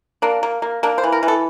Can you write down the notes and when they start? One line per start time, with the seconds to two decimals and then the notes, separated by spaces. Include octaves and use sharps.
0.22 A#3 D4
0.43 A#3
0.62 A#3
0.83 A#3 D4
0.98 C5
1.04 E3
1.12 A#4
1.23 E3
1.28 A4